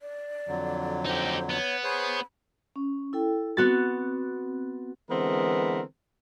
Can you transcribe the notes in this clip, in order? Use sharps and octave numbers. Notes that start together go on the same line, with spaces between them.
D5
F2 D3 F#3
D#4 G4 C5
B3 C#5
G#4 C5 C#5 B5
C#4
E4 A4 G5
B3 C4 F#4 A6
D3 E3 G#3 B3 C4 A#4